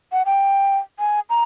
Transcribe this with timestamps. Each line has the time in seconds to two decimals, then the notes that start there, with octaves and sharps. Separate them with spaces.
0.12 F#5
0.26 G5
1.00 G#5
1.30 A#5